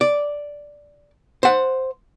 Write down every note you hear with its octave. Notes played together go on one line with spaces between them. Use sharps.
D5
C5 F#5